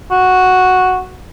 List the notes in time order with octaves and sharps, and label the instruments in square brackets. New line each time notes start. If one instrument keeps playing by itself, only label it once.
[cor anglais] F#4